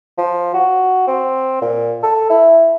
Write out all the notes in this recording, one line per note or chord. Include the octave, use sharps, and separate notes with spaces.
F3
F#4
C4
A#2
A4
E4